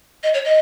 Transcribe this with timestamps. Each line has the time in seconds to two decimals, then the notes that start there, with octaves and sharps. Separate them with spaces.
0.23 D#5
0.34 C#5
0.45 D#5